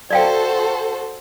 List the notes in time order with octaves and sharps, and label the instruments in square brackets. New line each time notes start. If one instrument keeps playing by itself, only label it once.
[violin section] F#4 A4 C5 [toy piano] D5 F5 G5